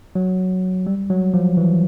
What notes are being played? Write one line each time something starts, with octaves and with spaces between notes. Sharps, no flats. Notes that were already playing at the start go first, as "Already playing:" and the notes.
F#3
G3
F#3
F3
E3